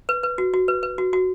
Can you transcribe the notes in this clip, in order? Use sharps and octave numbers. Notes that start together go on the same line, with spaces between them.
B4
B4
F#4
F#4
B4
B4
F#4
F#4